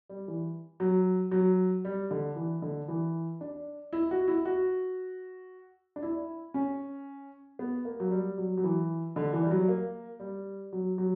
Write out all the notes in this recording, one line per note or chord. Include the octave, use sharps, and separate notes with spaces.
G3
E3
F#3
F#3
G3
D3
E3
D3
E3
D4
E4
F#4
E4
F#4
D4
E4
C#4
B3
A#3
F#3
G3
F#3
F#3
E3
D3
E3
G3
F#3
A#3
G3
F#3
F#3